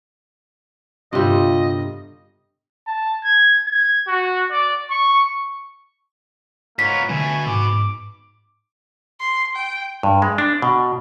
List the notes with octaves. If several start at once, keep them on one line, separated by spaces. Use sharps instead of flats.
G1 C3 G3 F4 D#5
A5
G#6
G#6
F#4
D5
C#6
G#2 A#3 B3 F4 C#5 B6
B2 D3 A3 G#5
G#2 D6
C6
G5
G2
G#3
D4
B2